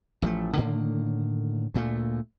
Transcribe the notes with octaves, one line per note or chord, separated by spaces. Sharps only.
A1 F3 G#3 A3
A2 D3 D#3 A#3
D2 A#2 G#3 A3